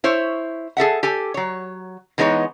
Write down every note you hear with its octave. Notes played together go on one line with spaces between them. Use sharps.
E4 C5 C#5
G#4 A4 E5 F#5
G4 A4 G#5
F#3 C#5
E3 G#3 B3 D#4 C#5